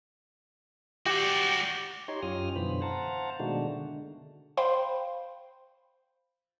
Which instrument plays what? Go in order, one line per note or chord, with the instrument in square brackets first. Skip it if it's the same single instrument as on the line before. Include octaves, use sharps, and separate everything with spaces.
[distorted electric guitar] F#4 D5 [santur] G4
[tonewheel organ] D#4 G4 C#5 C6
F#2 C#4 F4 G4 D#6 F6
F#2 B2 D3 E3 C5 B5
C5 F5 F#5 A5 A#5
B2 D#3 G#3 A3 D4 F#4
D3
[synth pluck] C5 F5 G5 B5 C6